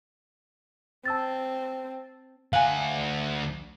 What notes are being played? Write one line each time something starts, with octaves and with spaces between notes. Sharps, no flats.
C4 A5 E6 A6
D2 F5 F#5 G#5